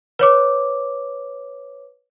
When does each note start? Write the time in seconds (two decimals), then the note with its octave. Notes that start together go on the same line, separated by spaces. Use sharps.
0.19 B4 C#5 D6